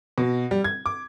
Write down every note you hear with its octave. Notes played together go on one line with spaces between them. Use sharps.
B2
G3
G#6
D6